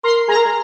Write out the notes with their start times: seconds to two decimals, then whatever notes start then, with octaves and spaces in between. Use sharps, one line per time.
0.04 A#4 C6
0.28 G#4 A#5
0.37 A#4
0.45 G#4